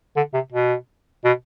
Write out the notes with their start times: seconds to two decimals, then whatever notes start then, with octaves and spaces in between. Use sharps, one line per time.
0.16 D3
0.34 C3
0.52 B2
1.25 B2